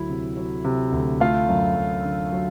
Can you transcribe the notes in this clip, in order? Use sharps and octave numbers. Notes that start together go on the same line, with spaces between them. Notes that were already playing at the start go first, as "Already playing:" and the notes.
Already playing: D2 F#3 E4
C3
F#3
C3
D2
A3 F4 F5
F#2
F#2
D3
F#3